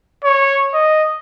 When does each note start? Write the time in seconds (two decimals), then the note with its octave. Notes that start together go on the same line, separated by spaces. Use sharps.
0.24 C#5
0.74 D#5